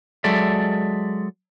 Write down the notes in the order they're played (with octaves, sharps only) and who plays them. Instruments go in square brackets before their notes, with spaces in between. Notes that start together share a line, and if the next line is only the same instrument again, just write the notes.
[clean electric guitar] F#3 G#3 A4 D5 E5